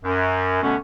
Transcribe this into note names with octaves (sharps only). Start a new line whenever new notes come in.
F#2
B2 D3 A3 B3 C#4